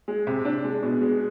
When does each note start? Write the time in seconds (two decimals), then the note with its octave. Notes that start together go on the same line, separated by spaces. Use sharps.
0.08 G#3
0.27 C3
0.45 D4
0.64 G#3
0.83 B2
1.01 G#3